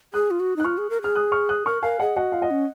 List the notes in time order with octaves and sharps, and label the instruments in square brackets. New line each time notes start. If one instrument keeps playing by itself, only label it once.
[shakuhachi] G#4 [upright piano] D#6 F#6
[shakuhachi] F4
F#4
[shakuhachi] D#4 [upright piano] F#6
[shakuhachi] F4 [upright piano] C#6 F6
[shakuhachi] G#4
A#4
[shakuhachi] G#4 [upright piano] F6
[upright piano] D#6 F#6
C#6 F6
D#6 F#6
[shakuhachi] A#4 [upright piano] C#6 F6
[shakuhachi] A#4 [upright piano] F5 G#5
[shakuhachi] G#4 [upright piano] D#5 F#5
[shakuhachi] F#4 [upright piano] D#5 F#5
[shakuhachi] F4 [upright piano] F5
[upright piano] D#5 F#5
[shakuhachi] C#4